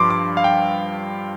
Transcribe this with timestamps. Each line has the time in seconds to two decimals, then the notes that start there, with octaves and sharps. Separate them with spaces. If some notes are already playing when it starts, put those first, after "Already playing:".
Already playing: G2 F3 C6 D6
0.10 D6
0.37 F5
0.44 G5